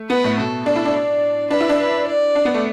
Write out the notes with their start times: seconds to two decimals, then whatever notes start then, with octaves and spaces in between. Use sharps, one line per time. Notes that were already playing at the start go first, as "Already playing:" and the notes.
Already playing: A3
0.10 B3 B4
0.24 A2
0.38 B2 A4
0.66 D4 A4
0.76 E4
0.85 D4
0.94 D5
1.50 D4 B4
1.60 E4
1.69 D4
1.79 B4
2.08 D5
2.35 D4
2.45 B3
2.54 A3